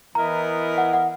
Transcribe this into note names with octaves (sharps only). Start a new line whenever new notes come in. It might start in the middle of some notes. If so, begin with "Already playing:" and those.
E3 B3 E4 A#4 D#5 A#5
F#5
F#5